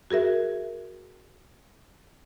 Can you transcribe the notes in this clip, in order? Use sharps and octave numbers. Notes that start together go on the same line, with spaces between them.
F#4 G#4 A#4 E5